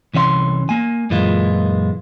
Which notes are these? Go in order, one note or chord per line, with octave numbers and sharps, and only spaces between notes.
C2 E3 C#4 E5 C6
A#3 G#5
F#2 A#2 E3 G#3 F4